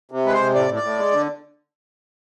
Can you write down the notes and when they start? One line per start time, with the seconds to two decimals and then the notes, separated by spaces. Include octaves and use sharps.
0.11 C3
0.26 G#3 B4
0.32 C5
0.40 C3
0.54 A2 D5
0.69 A2
0.76 D5
0.83 A2
0.98 G#3
1.12 D3